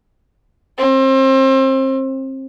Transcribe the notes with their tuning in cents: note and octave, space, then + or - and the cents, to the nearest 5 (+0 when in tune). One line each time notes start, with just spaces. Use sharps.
C4 +30